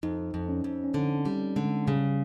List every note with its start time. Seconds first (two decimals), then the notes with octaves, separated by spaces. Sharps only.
0.03 F2 D#4
0.34 F2
0.48 C#4
0.64 F2
0.84 C#4
0.94 D3 C4
1.25 G3
1.56 D3 G#3
1.87 C#3 G3